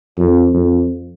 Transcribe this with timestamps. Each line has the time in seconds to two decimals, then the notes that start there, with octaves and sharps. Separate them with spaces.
0.17 F2
0.54 F2